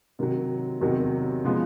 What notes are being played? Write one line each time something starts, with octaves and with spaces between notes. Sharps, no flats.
C3 D#3 F#3
E2 C3 D#3 F#3
C#3 F3 G#3 B3